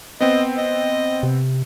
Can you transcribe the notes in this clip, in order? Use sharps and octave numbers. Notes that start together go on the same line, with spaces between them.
B3 C4 D#5
D#5
C3